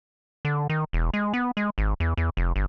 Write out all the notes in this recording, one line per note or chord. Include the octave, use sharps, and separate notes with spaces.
D3
D#3
E1
G#3
B3
G#3
G#1
E2
E2
F1
G1